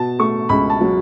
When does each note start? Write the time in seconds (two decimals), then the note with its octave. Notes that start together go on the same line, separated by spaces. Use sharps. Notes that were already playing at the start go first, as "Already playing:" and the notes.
Already playing: B2 A5
0.19 A3 C#6
0.49 C#2 B5
0.70 A5
0.81 F#3